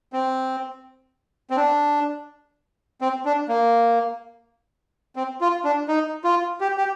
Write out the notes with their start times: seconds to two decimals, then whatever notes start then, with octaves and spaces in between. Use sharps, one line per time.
0.13 C4
1.50 C4
1.57 D4
3.01 C4
3.25 D4
3.48 A#3
5.16 C4
5.41 F4
5.64 D4
5.88 D#4
6.24 F4
6.61 G4
6.78 G4